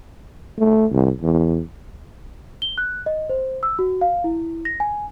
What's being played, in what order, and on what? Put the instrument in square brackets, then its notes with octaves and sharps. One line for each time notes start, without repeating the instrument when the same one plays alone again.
[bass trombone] A3
C2
E2
[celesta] G7
F#6
D#5
C5
E6
F#4
F5
E4
A#6
G#5